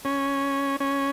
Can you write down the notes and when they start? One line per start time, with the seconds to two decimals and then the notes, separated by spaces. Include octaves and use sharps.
0.05 C#4
0.80 C#4